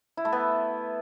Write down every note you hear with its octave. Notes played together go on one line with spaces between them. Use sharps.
E4
A3
B3